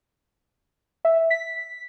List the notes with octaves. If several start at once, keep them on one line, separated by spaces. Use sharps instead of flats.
E5
B6